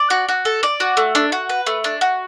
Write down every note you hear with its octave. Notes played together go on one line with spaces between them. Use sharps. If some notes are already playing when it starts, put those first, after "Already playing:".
Already playing: D5
F#4
F#4
A4
D5
F#4
A3
D4
F#4
B4
A3
D4
F#4